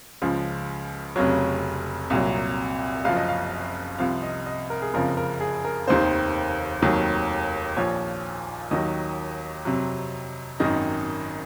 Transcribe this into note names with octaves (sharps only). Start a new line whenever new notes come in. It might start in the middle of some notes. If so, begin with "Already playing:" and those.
C#2 C#3 F3
F1 F2 C#3 F#3 C#5
C2 A#2 F#3
F#1 F#2 F3 F5
D#5
F5
C2 C3 F3 F5
D#5
D#5
A#4
G#4
F#1 F2 C#3 F3 A#4
A#4
G#4
A#4
F1 D#2 D#3 C5
F1 D#2 D#3 F#3
A#1 A#2 F3 C#5
D#2 D#3 F#3 D#5
F2 C3 F#3
G#1 F#2 D#3 D#5